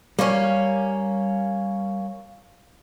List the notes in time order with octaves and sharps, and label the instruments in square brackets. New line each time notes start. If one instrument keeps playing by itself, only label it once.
[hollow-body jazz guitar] G3 [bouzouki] A#3 C#4